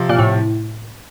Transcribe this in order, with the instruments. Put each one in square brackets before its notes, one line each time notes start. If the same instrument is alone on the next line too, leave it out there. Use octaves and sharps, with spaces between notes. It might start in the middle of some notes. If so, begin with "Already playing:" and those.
Already playing: [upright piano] C3 F3 C4
[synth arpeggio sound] A#2
A2